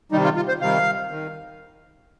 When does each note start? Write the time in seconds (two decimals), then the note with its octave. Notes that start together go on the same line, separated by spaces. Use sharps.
0.12 C3 D#3 G3 D#4
0.24 F4
0.36 F4
0.48 C5
0.61 C3 D#3 G3 F5
1.11 D#3